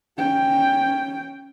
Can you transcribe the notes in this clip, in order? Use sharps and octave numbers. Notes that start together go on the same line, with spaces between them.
C#4 G5